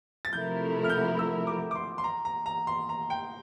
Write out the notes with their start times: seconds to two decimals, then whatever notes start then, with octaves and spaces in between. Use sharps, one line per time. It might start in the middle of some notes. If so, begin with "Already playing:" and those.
0.25 A6
0.33 C3 F3 A3 E4 A#4 G6
0.84 F6
0.89 G6
1.19 E6
1.47 D6
1.71 D6
1.75 C6
1.98 C6
2.04 A#5
2.25 A#5
2.46 A#5
2.67 C6
2.89 A#5
3.10 G5